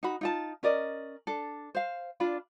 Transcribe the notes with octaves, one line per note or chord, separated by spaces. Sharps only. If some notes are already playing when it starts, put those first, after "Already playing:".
D#4 F#4 B5
D#4 F4 A5
C#4 A#4 D5 D#5
D4 A4
C5 F5
D4 F4 D5 B5